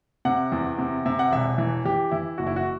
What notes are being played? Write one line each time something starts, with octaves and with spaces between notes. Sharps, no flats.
C3 F#5
E2
C3
C3 E5
F#5
E1 E5
E3
E3 G4
E3 E4
F#1 F#4
E4
F#4